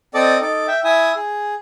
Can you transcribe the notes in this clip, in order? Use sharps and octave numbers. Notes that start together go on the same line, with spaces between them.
C4 A4 D5 D#5 D6
D#4 A4 D6
E5 G5
E4 E5 G#5 D#6
G#4